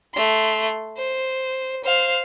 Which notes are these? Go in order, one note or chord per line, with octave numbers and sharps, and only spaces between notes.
A3 C6
C5
C5 F5